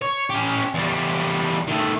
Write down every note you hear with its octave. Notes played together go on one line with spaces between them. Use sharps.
C#5
C#4 G4
E2 G3
D#3 A3